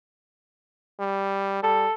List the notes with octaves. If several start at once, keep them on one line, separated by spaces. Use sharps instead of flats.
G3
G3 A4